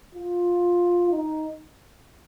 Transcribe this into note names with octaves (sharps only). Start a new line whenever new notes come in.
F4
D#4